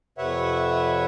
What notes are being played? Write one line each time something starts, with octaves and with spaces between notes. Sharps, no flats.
F2 C3 B4 C#5 E5 F#5